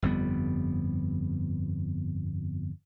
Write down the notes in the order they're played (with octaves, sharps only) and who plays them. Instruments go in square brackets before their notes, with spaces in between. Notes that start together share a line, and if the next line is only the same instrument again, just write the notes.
[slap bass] G1 F2 G3 B3